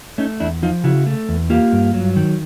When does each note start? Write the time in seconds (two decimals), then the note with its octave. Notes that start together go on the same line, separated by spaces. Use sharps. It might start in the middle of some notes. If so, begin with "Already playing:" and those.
0.18 A3 C#4 D#4
0.40 E2 D4 E4
0.63 F3 D#4 F4
0.84 C#3 E4 F#4
1.06 A3
1.29 E2
1.50 A#3 F4 G4
1.73 G2
1.94 F#3
2.16 D#3